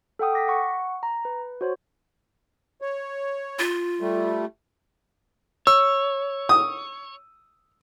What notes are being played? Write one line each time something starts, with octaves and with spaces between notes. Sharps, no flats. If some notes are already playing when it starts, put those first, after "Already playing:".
A4 F#5 G5 D#6
D6 A#6 B6
F#5 C#6
A#5
B4
F#4 C5 C#5
C#5
F4
G3 A3
C#5 E6
D#6